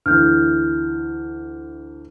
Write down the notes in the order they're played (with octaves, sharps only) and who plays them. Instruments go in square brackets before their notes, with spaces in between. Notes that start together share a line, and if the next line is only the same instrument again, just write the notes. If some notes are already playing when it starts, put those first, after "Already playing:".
[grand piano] D2 E3 [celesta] F6 G6